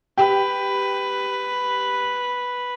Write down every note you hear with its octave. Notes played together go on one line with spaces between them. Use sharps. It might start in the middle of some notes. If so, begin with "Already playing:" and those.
G4 B4